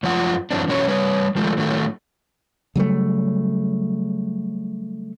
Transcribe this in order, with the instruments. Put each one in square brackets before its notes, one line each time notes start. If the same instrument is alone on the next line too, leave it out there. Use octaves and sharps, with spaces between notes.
[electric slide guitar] F#2 F3 F4 F#5
F#2 E3 C4 D4
E2 B2 F#3 C#4 F#4 C#5
G3 B4 C#5
D#3 F3 G#3 A3
A2 D#3 F#3 A3
[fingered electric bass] C#3 F#3 G3 A3